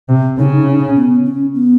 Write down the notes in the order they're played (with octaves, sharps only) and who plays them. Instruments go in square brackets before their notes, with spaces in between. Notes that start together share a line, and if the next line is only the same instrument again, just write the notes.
[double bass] C3
[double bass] C#3 [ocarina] D#4
[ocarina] D#4
C#4
B3
C#4
B3